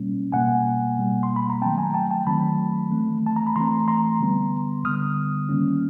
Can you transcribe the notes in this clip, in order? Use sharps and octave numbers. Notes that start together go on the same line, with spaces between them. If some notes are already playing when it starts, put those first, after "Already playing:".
Already playing: B2 G3 A#3 C#4
B2 G3 A#3 F#5 G#5
B2 G3 A#3
C6
B5
A#5
D#3 F#3 A3 C4 G5 A5
G#5 A#5
G5 A5
G5 A5
D#3 F#3 A3 C4 A5 B5
E3 A3 C4
A5
A#5
B5
E3 A3 C4 A#5 C6
A#5 C6
D3 G3 B3
D3 G3 B3 D#6 F6
D#3 G3 A#3 C#4